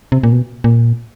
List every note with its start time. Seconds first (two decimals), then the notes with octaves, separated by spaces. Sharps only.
0.12 C3
0.23 A#2
0.32 B2
0.64 A#2